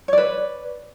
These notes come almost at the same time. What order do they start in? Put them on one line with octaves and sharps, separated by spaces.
C#5 D5 B4